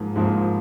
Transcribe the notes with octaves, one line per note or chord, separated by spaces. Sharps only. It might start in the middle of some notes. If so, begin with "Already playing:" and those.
Already playing: G#2 F3 A#3
G#2 F3 A#3